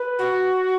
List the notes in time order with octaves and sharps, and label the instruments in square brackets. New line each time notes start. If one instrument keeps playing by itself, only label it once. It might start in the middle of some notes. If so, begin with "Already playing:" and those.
Already playing: [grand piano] B4
[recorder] F#4